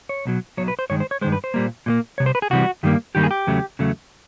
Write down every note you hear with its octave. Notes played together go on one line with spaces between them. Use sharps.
C#5
B1 B2 F#3
B1 B2 F#3 C#5
B4
C5
G2 D#3 G#3 C#5
C5
C#5
G2 D#3 G#3 C5
B4
C5
A#2 G3 A#3
A#2 G3 A#3
C2 C3 C#5
C5
B4
G#4
C2 C3 E3 G3 F#4
G2 D#3 G3 A#3
G2 D#3 G3 A#3 G4
G#4
G4
E2 C#3 F#3 A3
E2 C#3 F#3 A3